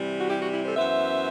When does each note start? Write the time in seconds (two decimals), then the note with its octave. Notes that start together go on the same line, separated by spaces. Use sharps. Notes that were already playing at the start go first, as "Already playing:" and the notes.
Already playing: C3 E3 G3
0.21 F#4
0.30 E4 G4
0.42 F#4
0.54 E4
0.65 A4 C5
0.76 F#2 E3 B3 C5 E5